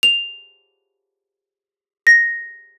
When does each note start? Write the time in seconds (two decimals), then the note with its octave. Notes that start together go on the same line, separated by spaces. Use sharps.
0.03 F7
2.07 A#6